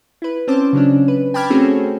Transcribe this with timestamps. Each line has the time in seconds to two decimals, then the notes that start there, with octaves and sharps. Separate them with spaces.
0.22 E4 B4
0.47 C4 C#4 C5 A5 D6
0.73 C#3 F#3 C#4 D4
1.08 B4
1.34 G5 A5 B5 D6 F6 G#6
1.50 A3 C4 C#4 F#4 G#4 A4